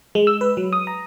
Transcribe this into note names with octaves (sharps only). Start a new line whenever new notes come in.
G#3
E6
B4
F#3
D#6
A#5